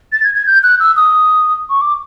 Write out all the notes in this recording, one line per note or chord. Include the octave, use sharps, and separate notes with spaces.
A6
G#6
G#6
G6
F#6
E6
D#6
C#6
D6